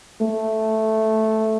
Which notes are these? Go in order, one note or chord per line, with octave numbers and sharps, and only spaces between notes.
A3